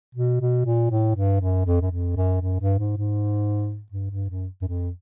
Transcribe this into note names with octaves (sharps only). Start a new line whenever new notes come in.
B2
B2
A#2
A2
G2
F#2
F2
F#2
F2
F#2
F#2
G2
G#2
G#2
G2
G2
F#2
F#2
F2